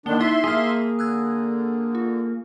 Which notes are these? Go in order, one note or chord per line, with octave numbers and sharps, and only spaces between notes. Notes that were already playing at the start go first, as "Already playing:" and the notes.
D3 D#3 A#3 D4 G7
D#4 E4 E5 C6 G7
A#3 G#4 A5 F6
D3 E6 F#6 G#6
F4